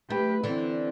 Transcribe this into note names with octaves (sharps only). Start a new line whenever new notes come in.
A3 G4 B4
D3 E3 C4 E4